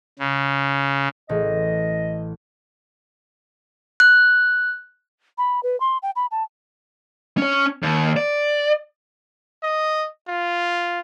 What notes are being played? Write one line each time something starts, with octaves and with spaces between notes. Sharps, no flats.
C#3
A1 D#5
F#6
B5
B4
C6
G5
B5
A5
C#4 C#5
D#2
D5
D#5
F4